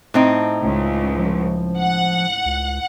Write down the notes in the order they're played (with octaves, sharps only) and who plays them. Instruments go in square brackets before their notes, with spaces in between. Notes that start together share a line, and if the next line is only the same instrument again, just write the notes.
[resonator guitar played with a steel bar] A2 C4 D#4
[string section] C#2
[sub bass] F3
[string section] F#5
[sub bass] C#2